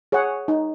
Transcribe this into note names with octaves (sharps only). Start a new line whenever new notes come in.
G#4 C#5 F#5
D#4